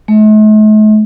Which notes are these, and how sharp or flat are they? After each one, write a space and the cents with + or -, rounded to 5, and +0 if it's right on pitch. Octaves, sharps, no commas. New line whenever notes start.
A3 -45